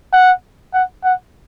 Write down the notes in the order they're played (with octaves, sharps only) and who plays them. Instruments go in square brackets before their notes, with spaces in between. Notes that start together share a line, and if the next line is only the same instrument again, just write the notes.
[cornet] F#5
F#5
F#5